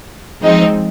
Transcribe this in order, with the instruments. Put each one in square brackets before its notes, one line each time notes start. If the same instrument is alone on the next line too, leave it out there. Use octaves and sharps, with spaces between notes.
[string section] F3 G#3 C4 D#4